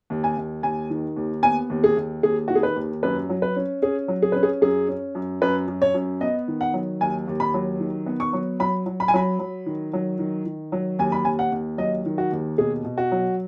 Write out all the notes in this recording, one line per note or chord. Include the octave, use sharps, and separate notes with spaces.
D#2
G#5
D#2
D#2 G#5
D#3
D#2
B3 G#5
D#2
G#4
D#2
D#2 G#4
D#3 F#4
G#4
B4
D#2
F#2 B4
F#3
B4
C#4
C#4 G#4
F#3
G#4
C#4 B4
G#4
F#2 G#4
C#4
F#2
F#2 B4
F#2
C#5
F#2
B3 D#5
D#3
F#5
F#3
D#2 G#5
D#2
B5
F#3
D#3
B3
C#6
F#3
F#3 B5
F#3
B5
G#5
F#3 B5
F#3
D#3
F#3
D#3
D#3
F#3
D#2 G#5
B5
D#2 G#5
F#5
D#2
F#3 D#5
D#3
F#4
D#2
B2 G#4
B2
F#4
F#3